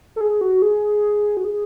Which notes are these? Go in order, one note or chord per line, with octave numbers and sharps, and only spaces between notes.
A4
G#4
F#4
G#4
F#4
G#4